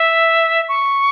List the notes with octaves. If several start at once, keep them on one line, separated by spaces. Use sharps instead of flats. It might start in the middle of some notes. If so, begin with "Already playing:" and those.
Already playing: E5
C#6